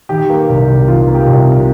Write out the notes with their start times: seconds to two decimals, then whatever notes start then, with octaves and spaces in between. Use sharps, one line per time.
0.09 D#3 G4
0.30 A#3
0.49 C2
0.69 C3
0.88 D#3 F4
1.08 A#3
1.14 G4
1.27 C2
1.48 C3